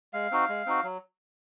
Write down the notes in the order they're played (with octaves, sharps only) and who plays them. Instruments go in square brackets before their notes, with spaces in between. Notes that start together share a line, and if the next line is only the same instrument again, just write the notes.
[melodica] G#3 F5
C4 D#4 F#4
G#3
C4 D#4 F#4
F#3